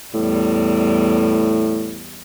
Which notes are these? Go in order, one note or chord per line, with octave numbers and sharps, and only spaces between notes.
E2 A2 G3